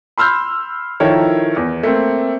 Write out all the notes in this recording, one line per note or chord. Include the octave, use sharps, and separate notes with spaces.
B5 C6 E6 F6 G6
D#3 F3 E4 A4 A#4 C#5
E2
A3 A#3 C4